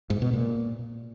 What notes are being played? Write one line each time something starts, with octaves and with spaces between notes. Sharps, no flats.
G#2
B2
A#2